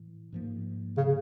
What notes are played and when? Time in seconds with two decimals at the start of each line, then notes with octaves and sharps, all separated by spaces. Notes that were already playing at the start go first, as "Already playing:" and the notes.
Already playing: A2 E3
0.32 G#2 F3 A#3
0.97 C#3